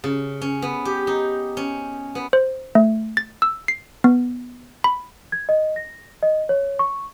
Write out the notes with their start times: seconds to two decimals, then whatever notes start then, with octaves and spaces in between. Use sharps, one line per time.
0.04 C#3
0.41 C#4
0.62 B3
0.85 G4
1.07 D#4
1.57 C#4
2.15 B3
2.33 C5
2.75 A3
3.17 A6
3.42 E6
3.68 C7
4.04 B3
4.84 B5
5.32 G#6
5.49 D#5
5.76 A#6
6.23 D#5
6.49 C#5
6.79 C#6